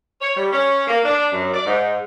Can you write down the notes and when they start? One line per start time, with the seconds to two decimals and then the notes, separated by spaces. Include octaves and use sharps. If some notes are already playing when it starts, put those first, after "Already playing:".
0.21 C#5
0.36 G3
0.52 C#4
0.87 A#3
1.04 D4
1.32 F#2
1.53 D5
1.65 G#2